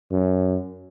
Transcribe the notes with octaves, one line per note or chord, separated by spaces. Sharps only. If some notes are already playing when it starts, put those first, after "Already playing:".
F#2